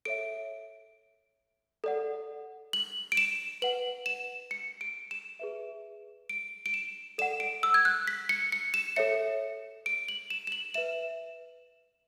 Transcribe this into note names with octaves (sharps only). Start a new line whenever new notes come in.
A4 C#5 E5 D7
A4 D5 F#5
F#7
D7
E7
B4 F#5 F#7
E7
C#7
D7
E7
G#4 B4 E5
D7
D7
E7
A4 D5 F#5 E7
D7
E6
G#6
F#6
B6
C#7
C#7
E7
A4 C#5 E5 C#7
D7
F#7
E7
E7
F#7
B4 E5 E7